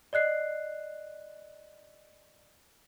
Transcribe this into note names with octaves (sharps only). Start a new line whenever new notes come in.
D5 D#5 F#6 C7